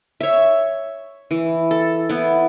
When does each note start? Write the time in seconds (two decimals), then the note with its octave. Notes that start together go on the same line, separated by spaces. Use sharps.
0.20 C#5 E5
1.31 E3
1.71 A4
2.09 B3 E4